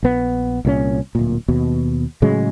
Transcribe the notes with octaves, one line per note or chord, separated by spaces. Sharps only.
A#1 B3
C2 A#2 G#3 C#4
D1 A#2
D#2 B2
A2 C#3 F#3 G#3